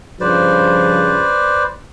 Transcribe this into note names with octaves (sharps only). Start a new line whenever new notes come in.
G2 C#3 F3 B4 C5 D5